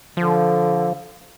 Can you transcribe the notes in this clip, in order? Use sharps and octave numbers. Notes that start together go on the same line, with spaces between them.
D3 F3